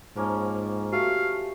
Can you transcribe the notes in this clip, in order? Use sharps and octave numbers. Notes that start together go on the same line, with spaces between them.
G#2 F3 A#3 C#4
A3 F#4 G4 F5